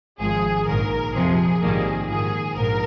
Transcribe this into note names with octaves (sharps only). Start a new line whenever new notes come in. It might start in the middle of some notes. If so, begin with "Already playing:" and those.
G#1 G#2 F3 G#4
A#1 G#2 D#3 A#4
F2 C3 F3 G#4
A#1 G#2 D#3 G3 A#3
A#1 G#2 D#3 G#4
A#1 G#2 A#4